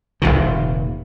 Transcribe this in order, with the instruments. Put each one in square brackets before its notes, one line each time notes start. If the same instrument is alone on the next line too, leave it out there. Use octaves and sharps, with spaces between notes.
[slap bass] F1 A#1 A#2 D#3